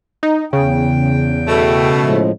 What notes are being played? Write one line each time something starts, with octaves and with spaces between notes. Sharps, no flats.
D#4
E2 C#3 G5
B2 A3
A2 F3 G#3